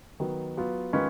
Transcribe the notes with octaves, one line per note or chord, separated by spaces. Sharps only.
D#3 F#3 B3
F#3 B3 F4
D#3 G#3 C#4 F4 B4